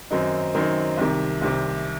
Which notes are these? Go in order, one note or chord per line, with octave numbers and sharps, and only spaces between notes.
F#2 D#3 F#3 C4 D#4
F#2 D#3 F#3 C4 D#4
C2 C3 D#3
C2 C3 D#3